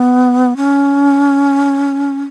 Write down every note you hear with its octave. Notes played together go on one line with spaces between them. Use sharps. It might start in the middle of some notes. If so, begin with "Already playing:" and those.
Already playing: B3
C#4